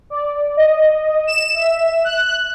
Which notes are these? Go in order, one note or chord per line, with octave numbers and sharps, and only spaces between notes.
D5
D#5
E7
E5
F#6